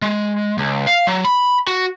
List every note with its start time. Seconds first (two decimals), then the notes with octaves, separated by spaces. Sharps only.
0.02 G#3
0.58 C#2
0.87 F5
1.07 F#3
1.25 B5
1.67 F#4